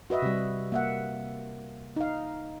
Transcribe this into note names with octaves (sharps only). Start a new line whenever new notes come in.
F#4 B4 D#5 E5
C3 G3
A#3 E5 F#5
D#4 F5